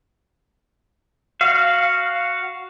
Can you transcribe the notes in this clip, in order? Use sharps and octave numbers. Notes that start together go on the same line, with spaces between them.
F#4 F5